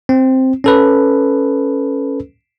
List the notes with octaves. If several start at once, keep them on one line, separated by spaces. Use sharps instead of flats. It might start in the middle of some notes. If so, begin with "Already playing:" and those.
C4
C#4 A4 B4